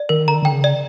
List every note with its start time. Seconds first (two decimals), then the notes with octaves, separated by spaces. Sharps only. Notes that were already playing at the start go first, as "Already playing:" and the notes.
Already playing: D5
0.09 D#3 A#4
0.28 D3 A#5
0.35 D#3
0.42 D3 G5
0.51 C#3
0.64 D5